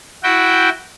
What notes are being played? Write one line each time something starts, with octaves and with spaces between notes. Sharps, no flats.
E4 F#4 G5